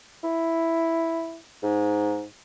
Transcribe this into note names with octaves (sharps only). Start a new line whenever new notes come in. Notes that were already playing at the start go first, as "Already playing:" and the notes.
E4
G#2